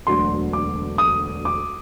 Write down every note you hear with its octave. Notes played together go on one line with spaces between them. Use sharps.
E1 D2 D3 F#3 C6
D6
D#6
D6